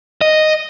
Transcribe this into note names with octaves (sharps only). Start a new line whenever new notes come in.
D#5